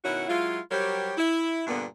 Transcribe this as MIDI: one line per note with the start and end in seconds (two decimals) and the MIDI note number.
0.04 0.27 47
0.04 0.27 51
0.04 0.27 61
0.04 0.27 64
0.04 0.27 66
0.04 0.27 78
0.29 0.59 54
0.29 0.59 56
0.29 0.59 64
0.29 0.59 65
0.71 1.13 54
0.71 1.13 55
0.71 1.13 67
0.71 1.13 70
0.71 1.13 72
0.71 1.13 73
1.17 1.63 64
1.67 1.85 43
1.67 1.85 46
1.67 1.85 50
1.67 1.85 58
1.67 1.85 59